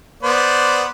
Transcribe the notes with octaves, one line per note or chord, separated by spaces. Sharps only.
B3 C5 D5